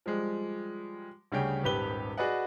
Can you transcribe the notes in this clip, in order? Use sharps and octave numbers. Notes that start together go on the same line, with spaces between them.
F3 G3 G#3
D2 C#3 G3 C#4 G#4 G5
D#1 G#1 G4 B4 G7
F#4 G#4 B4 D5 D#5 F#5